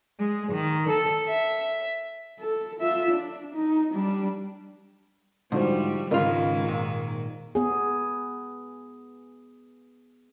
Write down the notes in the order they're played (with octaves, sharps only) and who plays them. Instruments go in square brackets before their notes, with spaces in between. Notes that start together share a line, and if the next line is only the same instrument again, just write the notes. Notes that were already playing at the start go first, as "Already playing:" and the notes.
[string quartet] G#3
D#3
A4
E5
[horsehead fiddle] A4
F4 E5
D4
D#4
G3 D4
[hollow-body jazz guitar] G#2 [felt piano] D3 F#4 C5 [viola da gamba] F3 G3
[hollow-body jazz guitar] C#2 F4 [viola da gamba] G#2 D#3 [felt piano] A#4 D#5 B5
[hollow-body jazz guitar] A#2
[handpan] B3 G#4